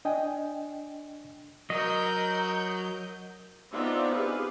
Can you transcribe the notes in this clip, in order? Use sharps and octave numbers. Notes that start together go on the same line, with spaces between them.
D4 D#5 G5 G#5
F#3 A#4 D#5 G6
B3 C4 D4 D#4 F4 E5
G4 G#4 B4 F5